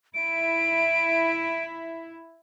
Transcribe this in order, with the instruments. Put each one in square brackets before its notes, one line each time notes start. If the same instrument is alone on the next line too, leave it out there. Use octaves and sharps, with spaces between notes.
[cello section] E4 [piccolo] D7